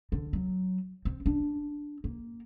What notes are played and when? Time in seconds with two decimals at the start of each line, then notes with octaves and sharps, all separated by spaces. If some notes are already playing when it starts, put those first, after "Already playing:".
0.12 D3
0.33 F#3
1.05 C4
1.26 D4
2.04 A#3